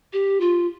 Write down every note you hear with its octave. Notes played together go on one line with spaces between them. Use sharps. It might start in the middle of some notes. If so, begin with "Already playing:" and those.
G4
F4